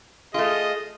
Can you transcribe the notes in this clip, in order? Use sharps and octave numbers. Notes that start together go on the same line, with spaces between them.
A3 F4 G#4 D#5